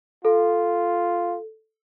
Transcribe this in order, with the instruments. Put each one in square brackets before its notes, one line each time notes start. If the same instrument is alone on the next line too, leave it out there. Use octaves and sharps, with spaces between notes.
[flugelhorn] F4 [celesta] A4